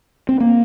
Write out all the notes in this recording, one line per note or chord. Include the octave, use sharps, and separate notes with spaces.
C4
A#3